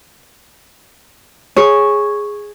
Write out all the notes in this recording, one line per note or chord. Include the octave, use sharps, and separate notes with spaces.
G#4 C#5